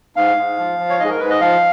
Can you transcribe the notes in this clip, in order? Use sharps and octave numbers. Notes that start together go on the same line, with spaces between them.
G#2 F5
G#2
F3
F3
C#5
G#2 D#5
G#4
A#4
G#2 B4
D#5
F3 F5